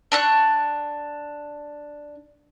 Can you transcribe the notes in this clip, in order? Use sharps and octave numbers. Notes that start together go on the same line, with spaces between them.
D4 C#6 F#6